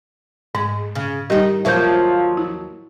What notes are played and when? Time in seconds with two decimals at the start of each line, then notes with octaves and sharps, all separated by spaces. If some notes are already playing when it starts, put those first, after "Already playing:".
0.55 G#2 G#3
0.95 C#3
1.30 D#3 G3 D#4 G4 D#5
1.65 D#2 F3 F#3 A#3 E5 G6
2.37 E4